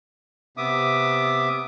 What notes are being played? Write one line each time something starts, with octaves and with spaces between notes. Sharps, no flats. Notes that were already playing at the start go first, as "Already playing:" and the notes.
C3 B3 E5 D6 D#6